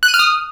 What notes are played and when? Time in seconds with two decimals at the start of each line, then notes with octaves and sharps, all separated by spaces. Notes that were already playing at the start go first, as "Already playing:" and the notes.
0.03 F#6
0.08 D#7
0.14 F6
0.19 D#6